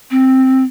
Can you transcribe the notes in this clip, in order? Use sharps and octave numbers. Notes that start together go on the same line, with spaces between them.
C4